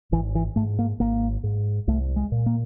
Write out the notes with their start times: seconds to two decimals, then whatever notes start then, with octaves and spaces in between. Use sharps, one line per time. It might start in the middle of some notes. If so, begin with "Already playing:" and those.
0.12 G#1 E3
0.35 E3
0.56 G#2 A3
0.79 A#3
1.00 G#1 A#3
1.43 G#2
1.88 C2 A3
2.16 G#3
2.32 A#2
2.46 A#3